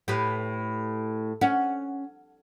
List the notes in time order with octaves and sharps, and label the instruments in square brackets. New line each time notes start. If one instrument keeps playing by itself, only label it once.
[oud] A2 G4 B4
[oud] C#4 [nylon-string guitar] F#5